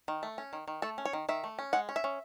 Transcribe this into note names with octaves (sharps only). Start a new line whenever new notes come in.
D#3
A3
C#4
D#3
D#3
A3 A4
C#4
C#5
D#3
D#3 E5
A3
C#4
G#3 F#5
C#4
E5
C#4